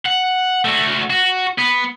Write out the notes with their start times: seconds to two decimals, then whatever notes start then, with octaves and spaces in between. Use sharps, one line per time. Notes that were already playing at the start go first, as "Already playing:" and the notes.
0.06 F#5
0.65 A3 F#4
1.10 F#4
1.58 B3